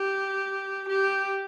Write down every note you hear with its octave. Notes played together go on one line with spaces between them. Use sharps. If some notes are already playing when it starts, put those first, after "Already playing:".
Already playing: G4
G4